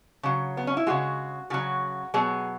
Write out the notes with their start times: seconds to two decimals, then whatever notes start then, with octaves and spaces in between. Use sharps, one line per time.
0.23 C#3 F#3
0.57 B3
0.67 C#4
0.77 E4
0.87 C#3 E3 G#3 F#4
1.50 C#3 F#3 F#4
2.14 B2 F#3 G#4